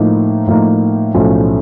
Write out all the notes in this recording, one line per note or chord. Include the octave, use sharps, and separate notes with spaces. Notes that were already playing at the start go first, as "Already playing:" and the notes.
Already playing: A2 F3 A#3 D#4
A2 F3 A#3 D#4
B1 A2 F3 A3 C#4